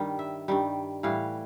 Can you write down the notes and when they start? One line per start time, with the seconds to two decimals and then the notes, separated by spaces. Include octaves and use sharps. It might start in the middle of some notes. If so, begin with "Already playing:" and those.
Already playing: G2 D#3 G3
0.19 E5
0.48 G2 D#3 G3
1.03 A2 E3 G3 F5